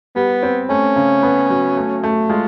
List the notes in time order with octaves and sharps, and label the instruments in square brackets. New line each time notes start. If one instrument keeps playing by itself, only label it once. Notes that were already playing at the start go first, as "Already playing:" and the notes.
[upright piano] G3 [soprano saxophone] B3
[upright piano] C4
[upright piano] A3 [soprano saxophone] C#4
[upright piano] C#3
B3
F#3
A3
A3
[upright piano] G#3 [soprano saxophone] F4